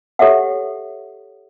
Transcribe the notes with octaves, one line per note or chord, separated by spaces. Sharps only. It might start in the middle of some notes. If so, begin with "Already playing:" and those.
G4 A4 C#5 E5 F#5